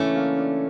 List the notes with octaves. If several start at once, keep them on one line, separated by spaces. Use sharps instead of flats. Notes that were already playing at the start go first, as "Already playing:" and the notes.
Already playing: C#3 E3 A3 A#3 C#4 D4
A#3
D4